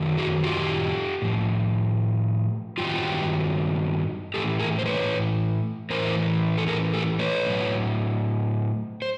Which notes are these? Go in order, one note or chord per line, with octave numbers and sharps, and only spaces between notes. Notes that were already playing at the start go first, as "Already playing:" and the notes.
Already playing: F#2 D#3 F#3
F#4 G#4
F4 G4
A2 F3
G2 D#3 F#3 F4 G4
A2 E3 G4 A4
G#4 A#4
C5
B4 C#5
A2 E3 A#4 C5
A4
G#4 A#4
G4 A4
B4 C#5
A2 F#3
C5